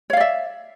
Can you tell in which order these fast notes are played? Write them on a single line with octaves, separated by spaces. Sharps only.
C#5 F5 D5 E5